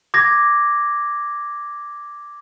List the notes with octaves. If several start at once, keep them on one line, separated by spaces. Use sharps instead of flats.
D6 G#6 A#6